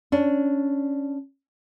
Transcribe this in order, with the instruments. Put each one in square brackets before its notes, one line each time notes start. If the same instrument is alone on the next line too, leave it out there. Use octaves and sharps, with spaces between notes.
[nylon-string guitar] C#4 D4